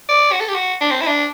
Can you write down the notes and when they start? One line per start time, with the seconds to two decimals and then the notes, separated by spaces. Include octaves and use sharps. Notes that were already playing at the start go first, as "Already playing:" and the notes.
0.09 D5
0.32 F#4
0.40 A4
0.48 G4
0.55 F#4
0.81 D4
0.91 C4
1.01 E4
1.07 D4